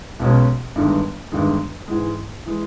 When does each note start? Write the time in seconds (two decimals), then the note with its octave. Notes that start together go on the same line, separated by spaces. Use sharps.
0.20 B1 B2 G#3 C#4
0.75 G1 G2 D#3 G#3
1.32 G1 G2 D#3 G#3
1.88 G#2 E3 G#3
2.46 E3 G#3